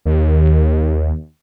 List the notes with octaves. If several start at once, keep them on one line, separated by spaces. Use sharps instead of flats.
D#2